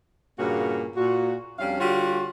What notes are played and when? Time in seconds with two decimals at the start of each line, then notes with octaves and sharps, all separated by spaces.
0.39 G2 A#2 C#3 A#3 F#4 G#4
0.96 A#2 F#4
1.59 F2 G3 C#4 D4 F5
1.80 D3 G3 F4 F#4 C#5 F5